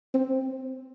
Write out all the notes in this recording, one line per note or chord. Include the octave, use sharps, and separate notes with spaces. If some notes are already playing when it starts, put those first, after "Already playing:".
C4